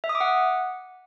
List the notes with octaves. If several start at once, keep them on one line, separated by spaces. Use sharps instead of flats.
E5
D#6
D6
F#5